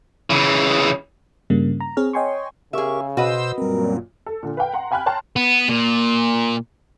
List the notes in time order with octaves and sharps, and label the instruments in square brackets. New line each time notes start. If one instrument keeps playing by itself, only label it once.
[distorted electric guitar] C#3 E3
[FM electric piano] G2 C#3 G3 A#3
A#5
C4 G#4 C#5 F6
C#5 D#5 G5 G#5 C6 C#6
[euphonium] C#3 [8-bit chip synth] G4 A#4 C#6 [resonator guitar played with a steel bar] G#4 E5
[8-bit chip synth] B2 [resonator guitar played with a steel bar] F#4 B4 D#5 [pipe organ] C5 E6
[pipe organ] F#2 A#2 [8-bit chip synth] G3 C4 [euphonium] A#4
[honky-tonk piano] A4
A#2 D3
B4 F5 G5
F#5 A#5 C6
F5 G5 G#5 B5 F6 F#6
C#5 G5 A5 A#5 C6
[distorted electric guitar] B3
A#2